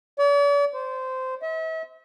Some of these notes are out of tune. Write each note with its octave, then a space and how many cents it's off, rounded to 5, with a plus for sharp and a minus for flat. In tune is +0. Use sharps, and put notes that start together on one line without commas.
D5 -45
C5 -15
E5 -40